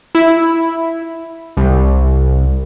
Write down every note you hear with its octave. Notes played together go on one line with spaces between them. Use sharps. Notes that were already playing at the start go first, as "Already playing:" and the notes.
E4
C2